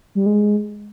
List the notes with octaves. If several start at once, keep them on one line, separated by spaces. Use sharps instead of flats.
G3
G#3